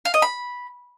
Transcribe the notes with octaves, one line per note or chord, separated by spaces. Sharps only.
F5
D#5
B5